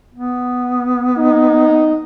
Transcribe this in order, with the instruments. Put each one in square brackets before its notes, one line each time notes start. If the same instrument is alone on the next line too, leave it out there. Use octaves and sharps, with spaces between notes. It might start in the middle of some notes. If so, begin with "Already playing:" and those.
[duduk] B3
[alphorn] D#4